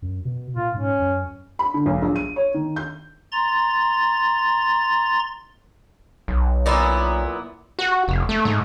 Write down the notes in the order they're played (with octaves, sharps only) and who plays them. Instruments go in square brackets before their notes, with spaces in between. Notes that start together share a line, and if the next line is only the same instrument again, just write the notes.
[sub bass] F#2
B2
[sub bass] A#2 [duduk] F4
[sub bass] G#2 [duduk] C#4
[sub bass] F#2
[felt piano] B5
D3
B1
A#1
D#7
C#5
D#3
G6
[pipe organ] A#5 C6 A6
[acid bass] B1
[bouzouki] A#2 B3 E4
[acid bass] F#4
F1
A3
G#2